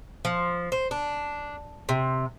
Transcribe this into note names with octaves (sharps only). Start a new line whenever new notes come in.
F3
C5
D4
C3